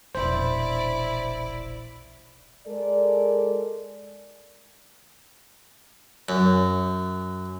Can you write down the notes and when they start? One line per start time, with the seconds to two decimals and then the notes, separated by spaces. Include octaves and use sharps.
0.15 E1 A#1 E4 C5 D5
2.66 G#3 A4 A#4 D5
6.29 F#2